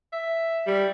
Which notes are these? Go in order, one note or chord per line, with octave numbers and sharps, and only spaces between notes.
E5
G3